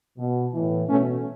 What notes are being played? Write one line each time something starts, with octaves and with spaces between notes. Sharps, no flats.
B2
A2 E3
B2 A3 C#4